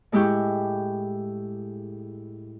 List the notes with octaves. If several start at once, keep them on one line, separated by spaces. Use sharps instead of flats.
A2 G#3 E4 G4 G5 C#6